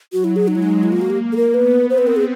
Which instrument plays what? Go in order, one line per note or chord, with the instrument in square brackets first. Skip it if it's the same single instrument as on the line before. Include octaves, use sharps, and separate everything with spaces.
[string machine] F#3 [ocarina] F#4
[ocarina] E4
G#4
[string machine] G#3 [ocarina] D#4
[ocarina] E4
D#4
[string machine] A#3 [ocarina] E4
[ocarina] F4
F#4
G4
A4
A#4
[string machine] B3 [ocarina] B4
[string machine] C4 [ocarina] C5
[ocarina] B4
A#4
G#4